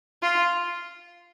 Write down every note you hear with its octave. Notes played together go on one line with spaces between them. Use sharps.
F4